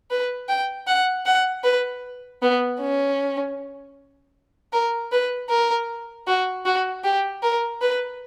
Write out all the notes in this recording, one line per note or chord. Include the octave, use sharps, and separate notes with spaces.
B4
G5
F#5
F#5
B4
B3
C#4
A#4
B4
A#4
F#4
F#4
G4
A#4
B4